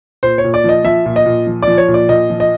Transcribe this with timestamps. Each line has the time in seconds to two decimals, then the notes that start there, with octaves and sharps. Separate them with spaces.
0.23 A#2 C5
0.38 C#5
0.44 A#2
0.54 D5
0.64 F3 D#5
0.84 F3 E5
1.06 A#2
1.16 D#5
1.26 A#2
1.47 F3
1.62 D5
1.68 F3
1.78 C#5
1.88 A#2
1.94 D5
2.09 A#2 D#5
2.30 F3
2.40 D#5